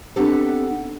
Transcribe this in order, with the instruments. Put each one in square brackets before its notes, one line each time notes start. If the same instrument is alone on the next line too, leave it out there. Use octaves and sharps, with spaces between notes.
[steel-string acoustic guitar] B3 C4 D4 D#4 G4 A4